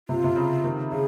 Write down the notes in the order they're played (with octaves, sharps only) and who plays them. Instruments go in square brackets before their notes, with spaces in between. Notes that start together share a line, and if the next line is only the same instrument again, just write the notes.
[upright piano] C3 [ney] F4
[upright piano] C3
C#3
D#3
[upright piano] C#3 [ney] G#4